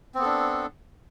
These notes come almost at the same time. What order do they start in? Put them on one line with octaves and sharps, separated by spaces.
C4 B3 A4 D4